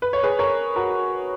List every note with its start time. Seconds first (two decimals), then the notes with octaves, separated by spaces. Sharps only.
0.02 B4
0.13 C#5
0.23 G#4 B4
0.39 A#4 C#5
0.76 F#4 A#4